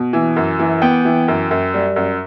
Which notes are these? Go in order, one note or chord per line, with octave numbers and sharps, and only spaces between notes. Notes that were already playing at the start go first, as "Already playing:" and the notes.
Already playing: B2
E3
F#2
E3
B3 G5
E3
F#2
F#2
G3
F#2